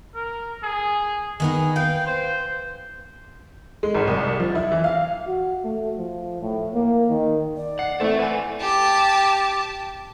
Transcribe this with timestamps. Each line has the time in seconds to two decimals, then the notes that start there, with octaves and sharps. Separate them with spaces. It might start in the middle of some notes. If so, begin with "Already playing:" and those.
0.15 A#4
0.63 G#4
1.40 D#3 B3 D#4 G#4
1.76 B4 F5 G5
2.07 C5
3.83 G#3
3.95 G#1
4.07 C2
4.40 F3
4.55 E4
4.72 E3
4.84 F5
5.27 F#4
5.64 A3
5.97 F3
6.42 A2
6.74 A#3
7.09 D#3
7.57 D5
7.79 F#5 C7
8.00 E3 A3 C4 A4 E5
8.19 B4 F#5 G#5
8.60 G4 A5